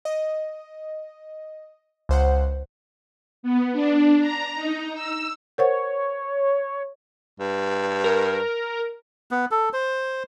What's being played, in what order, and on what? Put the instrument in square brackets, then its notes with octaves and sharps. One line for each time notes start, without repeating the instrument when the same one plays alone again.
[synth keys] D#5
C#2 C5 F#5
[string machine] B3
D4
A#5
D#4
E6
[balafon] A#4 C5 F#5 [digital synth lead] C#5
[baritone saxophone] G2
[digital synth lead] A#4
[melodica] B3
A4
C5